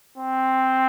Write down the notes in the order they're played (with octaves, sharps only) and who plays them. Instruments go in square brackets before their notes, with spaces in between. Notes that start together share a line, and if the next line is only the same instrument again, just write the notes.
[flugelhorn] C4